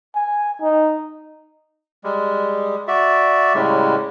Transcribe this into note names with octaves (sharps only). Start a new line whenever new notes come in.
G#5
D#4
G3 G#3
F#4 D5 E5
A2 C#3 G3 G#3